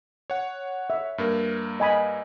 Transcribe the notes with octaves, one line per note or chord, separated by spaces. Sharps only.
C#5 F#5
E5
G2 A#3 A#4
D#5 G#5 B5